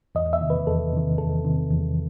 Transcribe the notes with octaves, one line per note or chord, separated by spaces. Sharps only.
E2 D#5
E5
C3 D#3
B4
E2 A4
C3 D#3
E2 A4
C3 D#3
E2